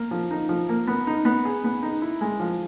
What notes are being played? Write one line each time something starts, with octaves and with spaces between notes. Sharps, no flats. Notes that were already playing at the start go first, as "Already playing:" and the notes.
Already playing: A#3
F3
D#4
F3
A#3
B3
D#4
B3
G#4
B3
D#4
E4
G#3
F3